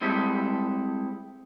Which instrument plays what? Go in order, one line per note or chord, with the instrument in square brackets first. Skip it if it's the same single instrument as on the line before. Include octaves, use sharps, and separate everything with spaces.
[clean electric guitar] G3 G#3 C4 E4 G4 A4